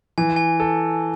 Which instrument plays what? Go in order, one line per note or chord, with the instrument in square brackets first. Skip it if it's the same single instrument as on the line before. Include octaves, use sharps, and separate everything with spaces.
[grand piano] E3 [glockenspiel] G#5
[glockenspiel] G#5
[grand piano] A4